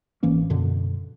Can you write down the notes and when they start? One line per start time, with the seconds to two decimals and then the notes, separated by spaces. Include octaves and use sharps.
0.23 G#1 E3 A#3 C#4
0.50 F#2 B2 D3